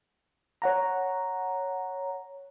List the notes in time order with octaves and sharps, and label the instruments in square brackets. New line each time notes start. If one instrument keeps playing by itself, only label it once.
[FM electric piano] C#5 F#5 A#5